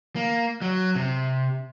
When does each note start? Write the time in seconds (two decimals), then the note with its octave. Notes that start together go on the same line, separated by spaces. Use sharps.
0.16 A#3
0.62 F#3
0.96 C3